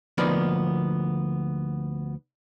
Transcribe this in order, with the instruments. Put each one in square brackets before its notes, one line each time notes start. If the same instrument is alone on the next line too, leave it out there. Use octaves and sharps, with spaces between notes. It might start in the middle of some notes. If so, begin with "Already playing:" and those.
[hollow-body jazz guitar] D2 F3 A#3 B3 D#4 D5